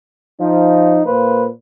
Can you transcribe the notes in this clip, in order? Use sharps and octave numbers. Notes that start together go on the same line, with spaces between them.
F3 D#4
A#2 A#3 B4 C5